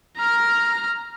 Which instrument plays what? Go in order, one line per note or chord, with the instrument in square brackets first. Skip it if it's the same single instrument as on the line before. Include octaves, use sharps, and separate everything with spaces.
[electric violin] A#5 F6